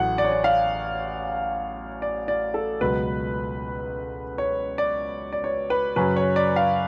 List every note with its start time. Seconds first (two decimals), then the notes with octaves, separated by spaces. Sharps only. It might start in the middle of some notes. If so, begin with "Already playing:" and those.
Already playing: A1 A2 F#3 F#5
0.18 D5
0.24 C#5
0.32 D5
0.44 F5
2.02 D5
2.28 D5
2.54 A4
2.81 C#2 B2 F#3 B4
4.38 C#5
4.78 D5
5.33 D5
5.44 C#5
5.70 B4
5.96 F#2 C#3 F#3 C#4 B4
6.16 C#5
6.36 D5
6.56 F5